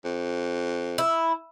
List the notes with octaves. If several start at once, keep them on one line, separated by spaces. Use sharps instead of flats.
F2
E4